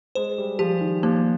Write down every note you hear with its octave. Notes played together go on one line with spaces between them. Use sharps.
G#3 C5
G3
F3 G4
D#3
F3 A#3